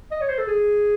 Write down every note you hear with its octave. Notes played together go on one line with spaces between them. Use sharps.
D#5
C#5
C5
A4
G#4